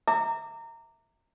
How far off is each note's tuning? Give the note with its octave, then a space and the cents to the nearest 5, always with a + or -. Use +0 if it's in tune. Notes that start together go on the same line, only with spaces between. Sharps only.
E5 -20 A#5 -20 D6 +0